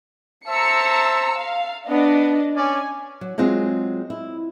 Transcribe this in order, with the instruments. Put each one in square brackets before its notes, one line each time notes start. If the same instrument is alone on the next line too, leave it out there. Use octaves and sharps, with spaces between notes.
[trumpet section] C5 E5 A5 [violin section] A#5 E6 C#7
[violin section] F5
[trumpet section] B3 [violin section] D4 D#5
[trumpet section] C#4 D5 [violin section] G#5
[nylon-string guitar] F#3
F#3 G#3 C4 F4 F#4 G#4
E4